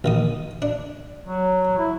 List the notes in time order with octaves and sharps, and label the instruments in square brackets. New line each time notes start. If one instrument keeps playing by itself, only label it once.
[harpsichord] A#1 D#3 D#6
D4
[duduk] F#3
E4